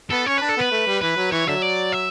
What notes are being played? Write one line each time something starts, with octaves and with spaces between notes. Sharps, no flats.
B3 A4
C#4 C#5
D4 B4
A4
B3 B4
A3
G3
E3 B4
F#3
E3 C#5
D3 F#3 E5
D5
E5